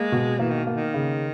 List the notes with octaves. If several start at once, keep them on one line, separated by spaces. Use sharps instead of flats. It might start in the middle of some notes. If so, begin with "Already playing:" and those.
Already playing: G#3 A#3
B2
E3 A#3
D#3
A#3
D#3
C#3